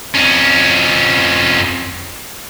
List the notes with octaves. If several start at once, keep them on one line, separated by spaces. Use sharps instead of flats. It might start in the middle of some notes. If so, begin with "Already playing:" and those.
F2 C#4